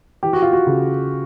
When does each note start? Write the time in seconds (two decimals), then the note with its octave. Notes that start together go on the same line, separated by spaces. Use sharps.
0.23 E3 G4
0.33 F#4
0.42 F4
0.53 F#4
0.67 C#3